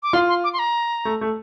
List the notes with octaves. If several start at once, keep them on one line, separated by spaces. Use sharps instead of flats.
D6
F4 C6
C6
D6
C6
A#5
A3
A3